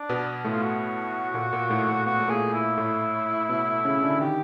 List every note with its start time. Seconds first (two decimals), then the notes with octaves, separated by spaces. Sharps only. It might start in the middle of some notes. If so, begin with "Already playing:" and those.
Already playing: D4
0.09 B2 B3
0.45 A2 A3
0.52 F4
0.63 F#4
1.34 A#2 A#3
1.53 A#2 A#3
1.70 A2 A3
1.88 A2 A3
2.06 B3 F#4
2.14 A#3
2.20 A3
2.28 A#2 A#3 G#4
2.54 E4
2.77 A2 A3
3.49 B2 B3
3.85 C#3 C#4
4.02 D3 D4
4.20 D#3 D#4 G4